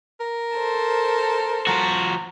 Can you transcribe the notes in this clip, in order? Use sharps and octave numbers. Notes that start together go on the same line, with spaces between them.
A#4
A4 C5
F3 F#4 A#5